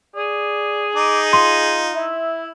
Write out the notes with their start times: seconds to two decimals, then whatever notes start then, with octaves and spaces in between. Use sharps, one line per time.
0.16 G#4 D5
0.95 D#4 D6
1.33 F4 C6
1.95 E4 E5